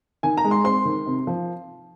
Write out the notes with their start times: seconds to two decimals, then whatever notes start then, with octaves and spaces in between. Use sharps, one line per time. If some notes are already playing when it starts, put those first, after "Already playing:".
0.23 D#3 G#5
0.37 A#5
0.44 G#3
0.51 C6
0.64 C4 C6
0.85 D#3
1.06 C3
1.27 F3